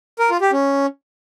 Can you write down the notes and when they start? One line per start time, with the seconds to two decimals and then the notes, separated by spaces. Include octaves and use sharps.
0.19 A#4
0.30 F4
0.41 G4
0.52 C#4